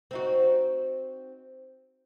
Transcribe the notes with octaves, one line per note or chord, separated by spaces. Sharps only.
C4 D#4 F#4